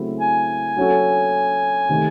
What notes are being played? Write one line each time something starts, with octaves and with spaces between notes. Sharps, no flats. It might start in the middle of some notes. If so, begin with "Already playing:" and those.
Already playing: C#3 F#3 A3 C4 E4
G#5
F#3 C#4 F#4 A4
C3 D#3 A3 C4